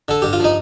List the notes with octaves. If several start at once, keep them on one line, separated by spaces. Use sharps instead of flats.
D3 A4
G2 G4
F4
F3 D#4